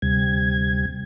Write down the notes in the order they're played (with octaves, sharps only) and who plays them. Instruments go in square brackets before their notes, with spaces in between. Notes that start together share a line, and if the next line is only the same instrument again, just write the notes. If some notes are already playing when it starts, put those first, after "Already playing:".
[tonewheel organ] D2 C3 G3 G#6